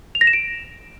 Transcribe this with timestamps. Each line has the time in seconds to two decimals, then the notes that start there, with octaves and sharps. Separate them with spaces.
0.15 F7
0.21 A#6
0.27 E7
0.33 D7